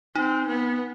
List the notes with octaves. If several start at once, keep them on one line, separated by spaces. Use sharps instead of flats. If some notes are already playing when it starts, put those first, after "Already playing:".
C4 D#4
B3